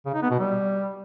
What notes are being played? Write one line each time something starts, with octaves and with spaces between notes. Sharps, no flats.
C#3
D#4
B3
B2
G3